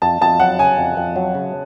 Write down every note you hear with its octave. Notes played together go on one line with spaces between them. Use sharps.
F2 A5
F2 A5
F#3 F#5
C#3 G#5
F2
F2
F#3
C#3